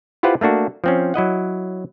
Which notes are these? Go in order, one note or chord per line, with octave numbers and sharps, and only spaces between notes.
E4 F4 G4 B4 C5 F#5
A3 A#3 D4 F#4
F3 C4 C#4
F#3 E4 D#5 F#5